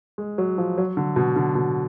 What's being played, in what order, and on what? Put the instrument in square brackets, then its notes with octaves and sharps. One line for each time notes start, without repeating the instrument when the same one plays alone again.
[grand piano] G#3
F#3
F3
F#3
D3
B2
D3
B2